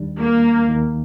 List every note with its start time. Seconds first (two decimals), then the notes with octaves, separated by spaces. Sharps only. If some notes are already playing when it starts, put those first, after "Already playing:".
Already playing: D#2 D#3 G3 D4
0.18 A#3
0.66 D#2 D#3 A#3